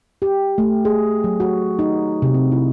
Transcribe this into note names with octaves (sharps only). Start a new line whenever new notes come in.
G4
A3
G#4
F#3
F#4
D#4
C3
C4
E4